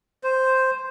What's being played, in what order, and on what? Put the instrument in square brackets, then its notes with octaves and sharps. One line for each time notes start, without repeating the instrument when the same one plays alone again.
[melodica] C5